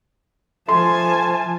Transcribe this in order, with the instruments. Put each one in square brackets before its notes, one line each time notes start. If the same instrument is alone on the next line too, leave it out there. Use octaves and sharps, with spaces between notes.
[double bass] F3 [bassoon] A3 [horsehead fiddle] G#5 A5 [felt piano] C6